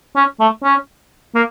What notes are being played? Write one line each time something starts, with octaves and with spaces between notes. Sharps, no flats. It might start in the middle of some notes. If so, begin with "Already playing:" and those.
C#4
A3
C#4
A#3